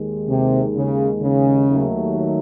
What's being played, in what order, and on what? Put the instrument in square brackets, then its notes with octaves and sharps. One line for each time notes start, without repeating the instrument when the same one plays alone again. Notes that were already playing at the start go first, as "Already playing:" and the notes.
Already playing: [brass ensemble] D#2 D#3 G#3
[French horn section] C3
C#3
C#3
[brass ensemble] D#2 D#3 F#3 A3